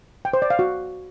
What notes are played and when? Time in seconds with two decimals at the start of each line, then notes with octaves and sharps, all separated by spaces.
0.25 G5
0.33 C5
0.42 D5
0.50 F5
0.59 F#4